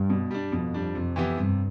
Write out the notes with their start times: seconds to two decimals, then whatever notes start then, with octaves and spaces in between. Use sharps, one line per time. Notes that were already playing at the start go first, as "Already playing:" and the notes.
Already playing: G2
0.10 B2
0.31 G3 D4
0.52 F2 B2
0.74 G3 D4
0.95 F2 C3
1.16 E3 B3 E4 G4
1.37 G2 C3